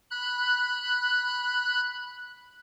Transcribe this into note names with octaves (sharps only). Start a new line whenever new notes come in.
B5 F#6